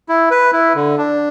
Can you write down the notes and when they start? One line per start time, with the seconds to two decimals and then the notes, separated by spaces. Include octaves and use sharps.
0.09 E4
0.31 B4
0.53 E4
0.75 D3
0.98 D4